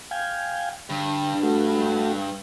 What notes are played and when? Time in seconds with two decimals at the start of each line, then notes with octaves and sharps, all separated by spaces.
0.11 F5 G5 G#5
0.90 G2 D3
1.43 A3 F#4